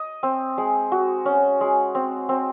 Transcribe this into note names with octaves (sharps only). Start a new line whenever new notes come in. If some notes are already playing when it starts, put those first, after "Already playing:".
Already playing: D#5
C4
G#3
F#4
C#4
G#3
C4
C4